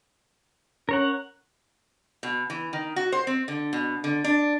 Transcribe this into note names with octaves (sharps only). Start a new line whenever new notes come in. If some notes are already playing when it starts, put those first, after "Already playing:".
C#4 A#4 C#5 F#5
B2
E3
D#3
F#4
C5
C4
D3
B2
D3
D4